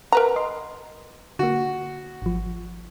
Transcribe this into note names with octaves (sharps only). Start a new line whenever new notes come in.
A#4 B4 F#5 A#5
D#5 C6
D3 A#3 F#4
G#1 F3